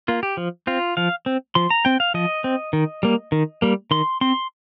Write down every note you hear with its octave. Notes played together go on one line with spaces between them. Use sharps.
A#3 F4
G4
F3
C4 F4
F3 F5
C4
F3 C6
A#5
C4 G5
F5
F3 D#5
C4
D#3
G3 A#3
D#3
G3 A#3
D#3 C6
C4 C6